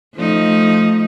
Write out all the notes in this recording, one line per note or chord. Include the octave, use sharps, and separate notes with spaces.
F3 A3 D#4